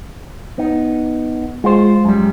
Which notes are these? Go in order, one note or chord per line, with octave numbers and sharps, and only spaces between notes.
B3 D#4
G#3 F4 C5
F#2 G3